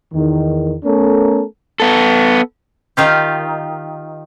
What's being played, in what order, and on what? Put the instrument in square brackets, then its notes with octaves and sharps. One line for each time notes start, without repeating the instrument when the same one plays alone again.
[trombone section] E2 D#3
A3 B3 C#4 A4 A#4
[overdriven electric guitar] B3 A4
[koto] D#3 F4 G4